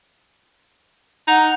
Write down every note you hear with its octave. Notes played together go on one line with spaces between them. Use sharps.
D#4 F#5